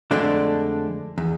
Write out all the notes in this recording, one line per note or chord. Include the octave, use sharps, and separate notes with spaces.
F2 D3 G#3 A3 D4
E2